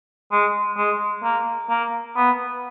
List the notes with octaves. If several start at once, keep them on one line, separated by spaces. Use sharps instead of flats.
G#3
G#3
A#3
A#3
B3